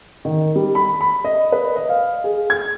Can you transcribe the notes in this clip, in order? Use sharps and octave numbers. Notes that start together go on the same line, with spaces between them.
D#3
G3
B5
B5
D#5
B4
D#5
F5
G#4
G#6